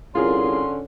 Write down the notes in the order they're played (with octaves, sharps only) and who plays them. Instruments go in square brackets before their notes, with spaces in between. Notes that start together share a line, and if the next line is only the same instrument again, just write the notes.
[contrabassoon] C2 [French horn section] D3 C#4 [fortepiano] F4 G#4 A#4 [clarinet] C6